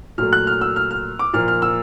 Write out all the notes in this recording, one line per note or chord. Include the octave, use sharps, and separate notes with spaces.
A#2 F#3 A3 F6
F#6
F6
E6
F6
F6
D6
A#2 F3 A#3 F6
F6
E6